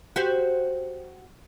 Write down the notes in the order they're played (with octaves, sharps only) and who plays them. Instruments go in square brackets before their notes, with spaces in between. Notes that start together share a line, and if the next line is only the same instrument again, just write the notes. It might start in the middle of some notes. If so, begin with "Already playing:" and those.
[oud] F#4 G4 C5